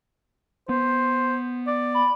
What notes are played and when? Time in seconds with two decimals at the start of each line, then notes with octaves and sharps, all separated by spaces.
0.69 B3 C5
1.67 D5
1.94 B5